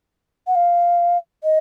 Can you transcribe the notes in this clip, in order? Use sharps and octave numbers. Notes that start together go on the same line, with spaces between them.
F#5
F5
D#5